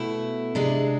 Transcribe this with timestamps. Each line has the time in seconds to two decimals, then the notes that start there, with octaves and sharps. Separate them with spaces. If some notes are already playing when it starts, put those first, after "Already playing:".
Already playing: B2 A3 E4
0.55 C3 G#3 D4